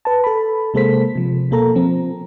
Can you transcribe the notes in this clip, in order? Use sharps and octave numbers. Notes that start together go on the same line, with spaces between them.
B4 A5
A4 B5
C3 G#3 A#3 A4 C5 B6
C3 F3
B2 A#3 A4 A#5
F3 C4